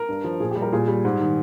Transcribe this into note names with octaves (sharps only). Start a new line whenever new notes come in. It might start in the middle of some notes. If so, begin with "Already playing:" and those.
Already playing: A#4
G2
F3
A#2 G#4
G4
G3
A#4
A#2 G#4
G3
G#2
D#3